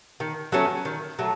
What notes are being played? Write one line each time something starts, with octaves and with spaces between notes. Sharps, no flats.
D#3
F#3 A3 C#4
D#3
F#3 A3